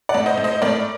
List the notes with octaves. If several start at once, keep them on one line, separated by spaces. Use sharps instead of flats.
D5 F#5
A2
C5 D#5
A2
C5 D#5
A2 A#4 D5